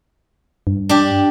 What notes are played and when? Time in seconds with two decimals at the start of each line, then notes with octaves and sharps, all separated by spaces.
0.67 G2
0.89 D4 G4